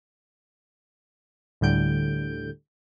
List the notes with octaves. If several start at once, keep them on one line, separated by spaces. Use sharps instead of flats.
D2 A2 D3 G3 G6 D7